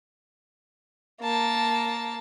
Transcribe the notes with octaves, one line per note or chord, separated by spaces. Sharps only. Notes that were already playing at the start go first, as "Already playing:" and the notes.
A#3 A5